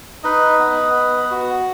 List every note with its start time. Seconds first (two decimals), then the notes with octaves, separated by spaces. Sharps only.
0.24 D#4 B4 D#5
0.59 B3
0.95 B3
1.31 F#4